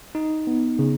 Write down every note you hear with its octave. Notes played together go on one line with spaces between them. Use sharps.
D#4
B3
C#3